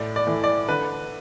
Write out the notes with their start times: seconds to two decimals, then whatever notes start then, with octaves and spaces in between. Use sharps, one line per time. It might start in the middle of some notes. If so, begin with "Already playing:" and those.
Already playing: A2 D5
0.16 D5
0.27 E3 A3
0.44 D5
0.68 D3 B4